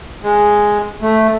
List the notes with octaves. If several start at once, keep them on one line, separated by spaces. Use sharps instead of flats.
G#3
A3